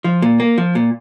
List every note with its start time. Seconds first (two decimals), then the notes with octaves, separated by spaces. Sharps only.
0.04 F3
0.22 A#2
0.40 A#3
0.58 F3
0.75 A#2